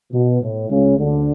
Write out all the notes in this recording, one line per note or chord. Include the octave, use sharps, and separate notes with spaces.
B2
A2
C#2 C#3
D2 D3